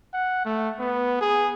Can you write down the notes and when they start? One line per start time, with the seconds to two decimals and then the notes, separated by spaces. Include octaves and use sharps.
0.14 F#5
0.46 A3
0.79 B3
1.21 G#4